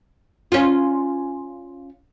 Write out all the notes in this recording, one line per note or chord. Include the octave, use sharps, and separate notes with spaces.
C#4 F4